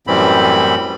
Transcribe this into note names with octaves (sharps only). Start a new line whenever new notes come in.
F#2 A2 E3 G3 C4 B5